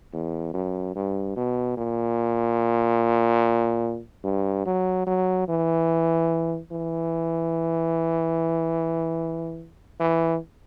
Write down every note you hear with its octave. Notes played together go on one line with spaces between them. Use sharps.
E2
F#2
G2
B2
A#2
G2
F#3
F#3
E3
E3
E3